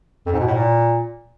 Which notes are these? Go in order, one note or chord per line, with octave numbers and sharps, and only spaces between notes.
F2
G#2
B2
A2
A#2